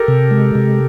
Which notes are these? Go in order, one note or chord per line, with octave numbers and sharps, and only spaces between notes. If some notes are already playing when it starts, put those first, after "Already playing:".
Already playing: G4 A4 A#4
C3
G#3
C3